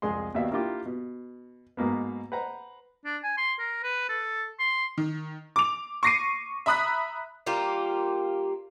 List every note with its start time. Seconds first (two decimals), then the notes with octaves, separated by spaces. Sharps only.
0.02 C2 F2 G#3 G#4 C6
0.34 D#2 B2 D5 E5 F5
0.51 A#3 D4 E4 F4 G4
0.86 B2
1.77 G#2 B2 A#3 B3
2.32 B4 C5 F#5 A#5
3.05 D4
3.24 G#5
3.38 C6
3.59 A#4
3.83 B4
4.09 A4
4.59 C6
4.98 D#3
5.56 D6 F7
6.03 C#6 D6 A#6 C7 C#7 D#7
6.66 E5 A#5 B5 D#6 F#6 B6
7.46 G3 A#3 F4 G4